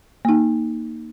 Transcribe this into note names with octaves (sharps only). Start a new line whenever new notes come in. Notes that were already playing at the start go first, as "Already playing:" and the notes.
A#3 D#4